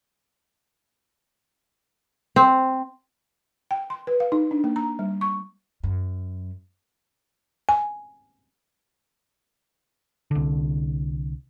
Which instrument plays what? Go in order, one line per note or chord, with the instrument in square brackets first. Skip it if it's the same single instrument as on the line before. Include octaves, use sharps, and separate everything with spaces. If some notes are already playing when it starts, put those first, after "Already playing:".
[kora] C4
[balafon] G5
C6
B4
F5
D#4
D4
A#3
A#5
G3
C#6
[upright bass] F#2
[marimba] G#5
[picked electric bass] C2 D3